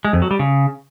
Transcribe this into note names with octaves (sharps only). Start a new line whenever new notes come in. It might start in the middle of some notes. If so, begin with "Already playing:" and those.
G#3
F2
F#3
G3
C#3